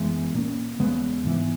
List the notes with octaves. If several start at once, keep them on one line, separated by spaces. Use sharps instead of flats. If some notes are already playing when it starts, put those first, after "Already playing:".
Already playing: F#2 E3 G#3 B3
A#2 A#3 C#4
E2 C#3 G#3 B3
G#2 E3 B3